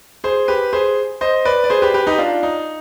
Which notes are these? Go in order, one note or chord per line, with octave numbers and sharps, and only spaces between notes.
G#4 C5
G4 B4
G#4 C5
C5 D#5
B4 D5
D5
G#4 C5
G4 B4
G4 B4
D#4 G4
D4 F4
D#4